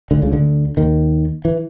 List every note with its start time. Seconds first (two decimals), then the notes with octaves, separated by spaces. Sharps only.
0.11 D2 D3
0.22 C#2 C#3
0.32 D2 D3
0.77 D#2 D#3
1.45 E3